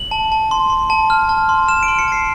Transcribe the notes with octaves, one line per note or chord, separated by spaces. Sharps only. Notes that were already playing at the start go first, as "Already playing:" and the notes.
Already playing: F#7
A5
A5
C6
C6
A5
F6
A5
C6
F6 E7
D7
C6
C#7
A5 C7